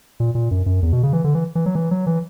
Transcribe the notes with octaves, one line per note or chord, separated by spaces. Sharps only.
A#2
A#2
F#2
F#2
E2
B2
C#3
E3
D3
E3
E3
F#3
E3
F#3
E3